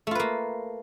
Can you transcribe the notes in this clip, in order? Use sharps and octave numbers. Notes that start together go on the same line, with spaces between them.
A3 A#3 F4 B4